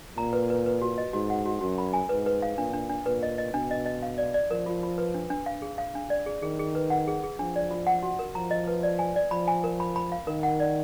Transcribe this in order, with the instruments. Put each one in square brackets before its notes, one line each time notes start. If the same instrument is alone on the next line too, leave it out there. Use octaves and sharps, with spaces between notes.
[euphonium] A#2 [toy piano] A#5
[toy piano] B4
B4
B4
F#4
D#5
[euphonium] G#2 [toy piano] F#4
[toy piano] F#5
F#4
[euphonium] F#2 [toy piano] F#4
[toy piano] B5
G#5
[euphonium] G#2 [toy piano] B4
[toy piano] B4
F5
[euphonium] A#2 [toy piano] D4
[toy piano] D4
D4
[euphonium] A#2 [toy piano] B4
[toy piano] D#5
D#5
[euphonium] B2 [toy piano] D4
[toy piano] D#5
D#5
F5
D5
D5
[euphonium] F3 [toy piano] A#4
[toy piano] F4
F4
B4
D4
D4
F5
G#4
F5
D4
D5
G#4
[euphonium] D#3 [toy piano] G#4
[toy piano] G#4
B4
F#5
G#4
G#4
[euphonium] F3 [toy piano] D4
[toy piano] D5
F4
F#5
F#4
A#4
[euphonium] F3 [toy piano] A#5
[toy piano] D#5
B4
D5
G#5
D5
[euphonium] F3 [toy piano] B5
[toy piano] G#5
A#4
B5
B5
F5
[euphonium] D#3 [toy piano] A#4
[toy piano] F#5
D5